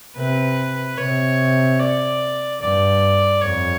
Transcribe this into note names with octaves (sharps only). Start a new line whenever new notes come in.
C3 B4
C3 C#5
D5
G2 D5
F2 C#5